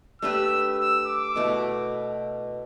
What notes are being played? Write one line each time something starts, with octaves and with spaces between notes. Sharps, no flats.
A3 D4 G4 B4 E6
E6
D6
B2 A3 E4